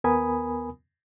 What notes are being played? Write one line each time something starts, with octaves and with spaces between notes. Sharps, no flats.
D#2 B3 A#4 G#5 B5 D#6